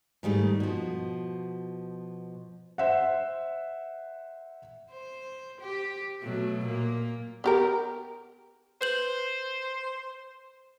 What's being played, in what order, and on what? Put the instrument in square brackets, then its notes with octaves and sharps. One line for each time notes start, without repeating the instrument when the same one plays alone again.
[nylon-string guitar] G#2 D#3 G3 A3
B2 F3
[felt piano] C5 E5 F#5
[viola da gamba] C5
G4
B2 F#3 A3
A#2 A#3
[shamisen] B3 G4 A#4
[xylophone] B4 G6 F#7 [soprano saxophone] C5